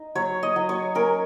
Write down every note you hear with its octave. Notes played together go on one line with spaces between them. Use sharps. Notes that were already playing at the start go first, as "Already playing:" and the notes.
Already playing: D#4
F#3 C#5
D#5
F#3
C#5
C#4 A#4